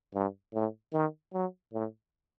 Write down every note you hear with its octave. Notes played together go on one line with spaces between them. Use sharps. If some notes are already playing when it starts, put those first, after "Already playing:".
G2
A2
D#3
F#3
A2